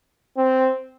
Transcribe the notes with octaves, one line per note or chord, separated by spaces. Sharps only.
C4